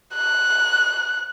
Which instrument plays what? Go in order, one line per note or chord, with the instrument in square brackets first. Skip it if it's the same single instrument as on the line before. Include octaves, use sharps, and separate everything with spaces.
[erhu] F#6